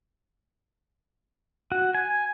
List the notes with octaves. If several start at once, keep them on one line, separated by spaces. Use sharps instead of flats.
F#4
G#5